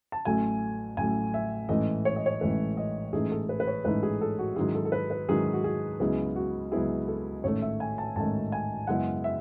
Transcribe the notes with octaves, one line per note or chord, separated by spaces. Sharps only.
A5
A1 A2 F#3 A3 G#5
A1 A2 F#3 A3 G#5
E5
A1 G#2 E3 A3 D#5
C#5
D#5
C#5
A1 G#2 E3 A3 B4
D#5
A1 G#2 E3 A3 D#4 G#4
A4
B4
B4
C#5
A1 G#2 E3 A3 D#4 B4
G#4
A4
F#4
G#2 D#3 F#3 C#4 E4 G#4
A4
A4
B4
B4
G#2 D#3 F#3 C#4 E4 G#4
F#4
G#4
C#2 C#3 F#3 B3 E4 G#4
F#4
C#2 C#3 F#3 B3 E4 G#4
A4
A1 G#2 D#3 A3 C#5
E5
G#5
A5
A1 G#2 D#3 A3 A5
G#5
F#2 C#3 G#3 B3 E4 F#5
E5